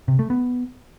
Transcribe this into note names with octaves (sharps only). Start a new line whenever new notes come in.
C3
A3
B3